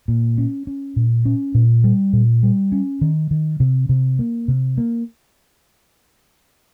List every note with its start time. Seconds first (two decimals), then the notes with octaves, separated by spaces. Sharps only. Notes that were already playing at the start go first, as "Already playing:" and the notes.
0.08 A#2
0.38 C#4
0.67 C#4
0.96 A#2
1.25 C#4
1.55 A#2
1.84 G3
2.13 A#2
2.43 G3
2.72 C#4
3.01 D#3
3.31 D#3
3.60 C3
3.89 C3
4.19 A#3
4.48 C3
4.78 A#3